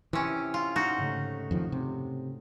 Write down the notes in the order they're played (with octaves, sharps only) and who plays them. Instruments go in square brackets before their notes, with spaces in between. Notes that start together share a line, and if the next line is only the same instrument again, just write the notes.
[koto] C3 C#4 [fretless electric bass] E3
[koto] F4 [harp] G6 G#6
[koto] D#4 F#4 [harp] C7 D7
[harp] G#2 C#3 A3
[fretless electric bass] F2 D#3 F3
C3